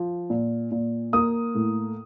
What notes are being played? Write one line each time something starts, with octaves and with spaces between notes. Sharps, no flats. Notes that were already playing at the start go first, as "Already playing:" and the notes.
Already playing: F3
A#2
A#2
A#3 D#6
A2